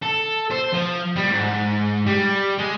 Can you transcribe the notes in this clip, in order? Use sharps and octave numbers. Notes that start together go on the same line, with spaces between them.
A4
C5
F3
G3
G#2
G3
G#3